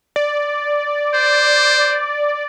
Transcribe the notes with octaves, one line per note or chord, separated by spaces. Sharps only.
D5
C5